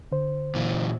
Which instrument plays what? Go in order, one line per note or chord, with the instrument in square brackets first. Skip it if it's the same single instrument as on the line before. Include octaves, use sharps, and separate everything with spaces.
[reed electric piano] D3 C5
[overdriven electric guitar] A#2 E3